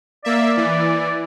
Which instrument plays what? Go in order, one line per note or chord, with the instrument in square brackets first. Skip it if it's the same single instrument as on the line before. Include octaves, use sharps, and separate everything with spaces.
[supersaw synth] A#3 E5 [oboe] D5
[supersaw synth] E3